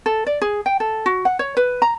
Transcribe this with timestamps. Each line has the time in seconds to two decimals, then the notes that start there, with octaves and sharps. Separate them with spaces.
0.06 A4
0.27 D5
0.42 G#4
0.66 G5
0.80 A4
1.06 F#4
1.25 F#5
1.39 C#5
1.57 B4
1.82 A#5